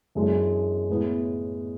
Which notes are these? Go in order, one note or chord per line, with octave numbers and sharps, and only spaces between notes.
F#2 E3 G#3 D4 G#4
A2 G#3 B3 E4